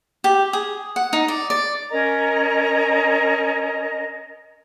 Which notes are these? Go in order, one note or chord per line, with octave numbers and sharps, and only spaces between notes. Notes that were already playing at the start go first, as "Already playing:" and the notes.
G4
G#4
F#5
D#4
D5
D5
C#4 A#4 D#5 A#5